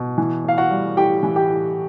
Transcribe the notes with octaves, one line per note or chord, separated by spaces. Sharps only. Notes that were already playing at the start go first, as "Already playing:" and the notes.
Already playing: B2
E3
A2 F5
F#4 F#5
G3
A2 G4 G5
E3
G4 G5
A2